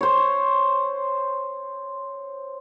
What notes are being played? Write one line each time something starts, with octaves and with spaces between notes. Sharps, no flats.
C5 C#5